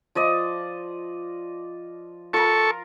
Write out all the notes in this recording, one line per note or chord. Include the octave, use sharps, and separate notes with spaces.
F3 D5 D#5
F4 A4 A#4 C#6